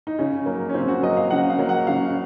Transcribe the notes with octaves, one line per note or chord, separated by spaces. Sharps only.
D#4
C#3 C#4
F#3 A#3
C#4
C#3 C4
F#4
F#3 A#3 D#5
F5
C#3 F#5
F5
F#3 A#3
F#5
C#3 F5